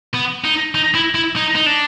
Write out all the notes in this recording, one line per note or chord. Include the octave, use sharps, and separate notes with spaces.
B3
D#4
D#4
E4
E4
D#4
D#4
D4